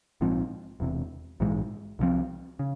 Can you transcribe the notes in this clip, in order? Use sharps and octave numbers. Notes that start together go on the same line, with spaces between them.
A#1 G#2 F3 C4
E1 E2 C3
A#1 G#2 E3 G#3
C2 C3 F3 C4
C#3